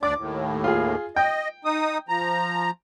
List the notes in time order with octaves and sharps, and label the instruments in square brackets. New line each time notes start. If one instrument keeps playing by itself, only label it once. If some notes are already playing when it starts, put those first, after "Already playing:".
[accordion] D2 D4 D5 [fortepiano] D6
[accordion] D#2 A2
[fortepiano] F4 G#4
[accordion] D#5 [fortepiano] G5
[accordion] D#4 D#6
F3 A#5